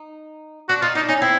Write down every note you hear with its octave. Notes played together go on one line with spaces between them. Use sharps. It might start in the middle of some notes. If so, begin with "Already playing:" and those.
Already playing: D#4
D4 F#4
D#4 F4
D4 D#4
C#4 D#4
C4 E4